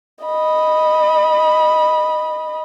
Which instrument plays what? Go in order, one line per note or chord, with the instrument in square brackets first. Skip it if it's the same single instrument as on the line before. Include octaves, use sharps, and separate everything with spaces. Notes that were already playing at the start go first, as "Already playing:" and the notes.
[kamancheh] D#5 B5